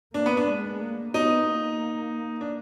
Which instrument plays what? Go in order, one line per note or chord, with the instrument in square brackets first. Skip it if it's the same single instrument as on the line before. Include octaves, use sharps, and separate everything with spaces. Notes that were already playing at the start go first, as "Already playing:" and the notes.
[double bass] A#3 [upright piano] D4
[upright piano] B3
D4
[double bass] G#3
A#3
[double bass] B3 [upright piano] D#4
[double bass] A#3
[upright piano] D4